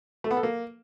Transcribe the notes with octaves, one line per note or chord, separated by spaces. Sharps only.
A3
B3
A4
A#3